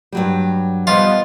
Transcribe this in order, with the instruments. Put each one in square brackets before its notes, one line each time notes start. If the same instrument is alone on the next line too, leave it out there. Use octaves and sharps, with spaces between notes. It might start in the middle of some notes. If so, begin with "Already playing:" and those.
[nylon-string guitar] G2 F#3 G3
[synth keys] F3 G3 B3 [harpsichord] F4 [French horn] D#5